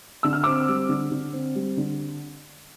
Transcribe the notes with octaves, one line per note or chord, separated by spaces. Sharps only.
D3 E6
F6
C4 D6 E6
G3
D3
D3
C4
G3
D3